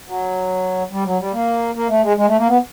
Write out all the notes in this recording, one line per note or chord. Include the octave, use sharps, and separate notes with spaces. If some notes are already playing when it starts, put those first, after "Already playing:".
F#3
G3
F#3
G3
A#3
A#3
A3
G#3
G#3
A3
A#3
B3